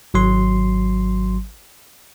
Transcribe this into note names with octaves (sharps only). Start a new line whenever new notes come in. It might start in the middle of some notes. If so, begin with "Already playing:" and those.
G#1 F#3 C6